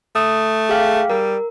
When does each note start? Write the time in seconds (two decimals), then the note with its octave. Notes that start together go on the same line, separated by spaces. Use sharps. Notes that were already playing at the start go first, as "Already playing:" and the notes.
0.15 A3 D#6
0.69 G#4 F5 G5
1.10 G3 A#4